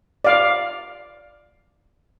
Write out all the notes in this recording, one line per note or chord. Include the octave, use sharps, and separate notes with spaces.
D5 F5